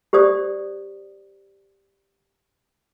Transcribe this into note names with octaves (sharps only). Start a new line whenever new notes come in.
G4 C5 D5 D#6